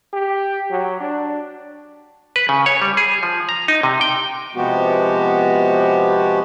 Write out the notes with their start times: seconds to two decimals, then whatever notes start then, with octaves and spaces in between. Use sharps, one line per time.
0.13 G4
0.71 F#3
1.00 D4
2.36 B4
2.49 C#3
2.66 C#5
2.82 G3
2.97 G#4
3.23 F3
3.49 A#5
3.68 D#4
3.83 C3
4.01 G5
4.55 C3 F3 G#3 B3 F#4 G4